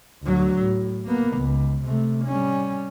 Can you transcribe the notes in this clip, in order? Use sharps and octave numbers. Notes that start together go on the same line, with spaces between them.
D2 F#3
A2
A#3 B3
C#2
C3 A3
G3 C#4